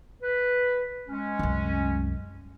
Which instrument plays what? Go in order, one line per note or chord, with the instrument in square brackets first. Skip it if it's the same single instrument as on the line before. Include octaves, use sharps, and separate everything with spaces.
[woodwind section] B4
G#3 C#4
[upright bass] C2 F#2